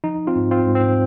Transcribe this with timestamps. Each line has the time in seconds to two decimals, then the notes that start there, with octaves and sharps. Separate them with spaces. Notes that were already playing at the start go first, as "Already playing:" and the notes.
0.04 F3 D#4
0.27 C4 F4
0.36 G#2
0.51 C4 F4
0.66 G#2
0.75 C4